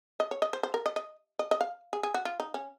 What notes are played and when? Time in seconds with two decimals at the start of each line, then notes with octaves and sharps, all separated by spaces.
0.20 D#5
0.31 C#5
0.42 D#5
0.53 C5
0.63 C5
0.74 A#4
0.86 D#5
0.96 D#5
1.39 D#5
1.51 D#5
1.61 F5
1.93 G#4
2.03 G#4
2.14 F#4
2.25 F4
2.40 D#4
2.54 C#4